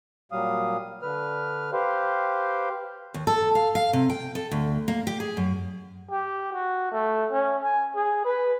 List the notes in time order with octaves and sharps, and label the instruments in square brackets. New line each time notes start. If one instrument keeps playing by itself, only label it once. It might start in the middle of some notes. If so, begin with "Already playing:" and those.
[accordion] A#2 F#3 G3 F5 D#6
D3 B4 F6
G4 B4 C5 F5
[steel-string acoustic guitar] D#2
A4
F5
F5
C3
G5
A4
D2
A#3
G4
G#4
F#2
[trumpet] G4
F#4
A3
C#4
G#5
G#4
B4